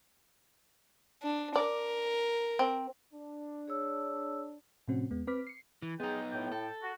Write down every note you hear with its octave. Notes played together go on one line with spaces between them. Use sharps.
D4
A#4 D5
C4
D4
G#4 C#5 E6
A2 C3 F3 C4 C#4 F#4
E2 G#3 B3
C4 B4 D6 F6 B6
C7 C#7
E3
G#3 B3 D#4 G#4 G5
A2 G5
A4
F#4